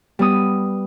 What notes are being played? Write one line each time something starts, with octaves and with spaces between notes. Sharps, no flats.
G3 B3 D#6